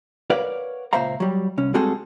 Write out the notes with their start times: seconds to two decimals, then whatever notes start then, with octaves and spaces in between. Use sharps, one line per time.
0.30 A#4 B4 C#5 D5 F5 F#5
0.93 C#2 A#2 C5 E5 F5 A#5
1.20 F#3 G3
1.58 C2 C#4
1.74 G3 G#3 C4 F#4 G#4 A4